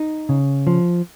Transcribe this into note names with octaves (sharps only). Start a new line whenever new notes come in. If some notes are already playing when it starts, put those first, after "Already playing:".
Already playing: D#4
C#3
F3